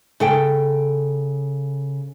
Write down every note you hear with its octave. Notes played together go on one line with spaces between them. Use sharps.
C#3 A4 G5